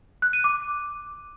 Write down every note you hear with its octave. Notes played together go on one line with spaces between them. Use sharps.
F#6
D#7
D6